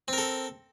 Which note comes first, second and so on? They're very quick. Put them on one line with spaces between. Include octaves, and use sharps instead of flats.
C4 A#4 A4